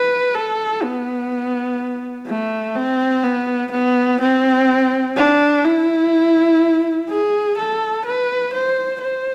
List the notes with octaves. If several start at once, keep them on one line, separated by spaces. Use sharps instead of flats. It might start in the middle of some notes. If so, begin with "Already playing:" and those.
Already playing: B4
A4
B3
A3
C4
B3
B3
C4
D4
E4
G#4
A4
B4
C5
C5